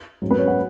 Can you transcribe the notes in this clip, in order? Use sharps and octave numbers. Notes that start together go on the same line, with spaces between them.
G#2 F#3 C#4
B3 B4
C#4 C#5
F#4 F#5